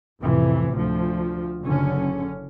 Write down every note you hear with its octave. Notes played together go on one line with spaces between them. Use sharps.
A1 F2 C3 E3
D2 F3
F#1 D3 C#4